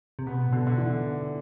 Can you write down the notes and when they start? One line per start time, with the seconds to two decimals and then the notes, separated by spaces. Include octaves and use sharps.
0.19 C3
0.26 B2 B3
0.47 A2
0.52 B2 D3
0.67 D3
0.78 E3